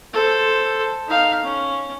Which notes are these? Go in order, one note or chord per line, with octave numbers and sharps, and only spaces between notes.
A4 C5
D#4 F5
C#4